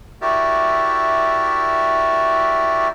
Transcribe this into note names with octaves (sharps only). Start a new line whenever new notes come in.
E4 F#4 G4 A#4 D5 E5